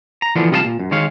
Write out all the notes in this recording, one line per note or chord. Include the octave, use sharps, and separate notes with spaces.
A#5
D3 E3 F3 A#3 B3 D4
C3 G3 F4 D#5 F5 A5
A#2
F#2
D#3 G#3 C#5 F5